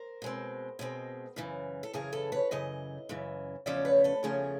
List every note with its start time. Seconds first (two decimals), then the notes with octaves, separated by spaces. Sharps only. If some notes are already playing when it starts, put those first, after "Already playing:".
Already playing: A#4 C5
0.22 B2 G#3 C4
0.79 B2 G#3 C4
1.36 F#2 C#3 E3
1.83 A4
1.93 F#2 C#3 E3 G#4 A#4
2.13 A4 B4
2.32 B4 C#5
2.51 F#2 C#3 E3 D#5
3.09 F#2 C#3 E3
3.66 E2 C#3 F3 A3 C#4 D5 E5
3.85 B4 C#5
4.04 A4 B4
4.23 E2 C#3 F3 A3 C#4 G#4 A#4